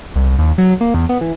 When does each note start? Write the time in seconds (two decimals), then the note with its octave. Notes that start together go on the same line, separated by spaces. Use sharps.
0.16 C2
0.39 D#2
0.58 F#3
0.81 A#3
0.94 E2
1.09 B3
1.21 E3